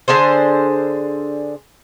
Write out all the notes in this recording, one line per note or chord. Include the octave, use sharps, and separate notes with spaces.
D3 D4 G#4 C5